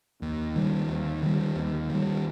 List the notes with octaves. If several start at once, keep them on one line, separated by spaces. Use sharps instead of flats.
D#2
D#3 G3
D#2
D#3 G3
D#2
D#3 G3